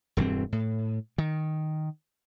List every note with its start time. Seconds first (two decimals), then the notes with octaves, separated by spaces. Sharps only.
0.17 E1 G2 E3 C4
0.52 A2
1.18 D#3